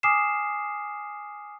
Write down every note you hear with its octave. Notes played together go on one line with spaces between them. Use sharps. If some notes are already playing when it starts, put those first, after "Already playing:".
G#5 D6 D#6 F6 C7 E7